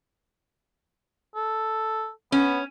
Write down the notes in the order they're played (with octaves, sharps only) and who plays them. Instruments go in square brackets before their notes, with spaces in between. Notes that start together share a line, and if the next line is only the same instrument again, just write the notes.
[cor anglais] A4
[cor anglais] B3 [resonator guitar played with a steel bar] C#4